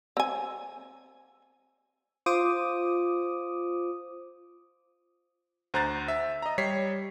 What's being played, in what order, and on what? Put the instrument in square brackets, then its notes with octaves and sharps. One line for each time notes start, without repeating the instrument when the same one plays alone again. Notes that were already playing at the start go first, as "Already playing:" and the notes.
[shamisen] C4 G#5
[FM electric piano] F4 C5 D6 D#6
[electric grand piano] D2 C5 A#5 F#6 G6 A6
E5
D#5 A#5
G3 C#5 B6 C7